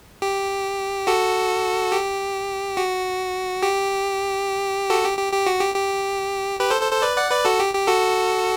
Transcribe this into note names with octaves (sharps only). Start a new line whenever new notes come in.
G4
F#4 A4
G4
F#4
G4
F#4 A4
G4
G4
G4
F#4
G4
G4
G4 B4
A4 C5
A4 C5
A4 C5
B4 D5
D5 F#5
B4 D5
F#4 A4
G4
G4
F#4 A4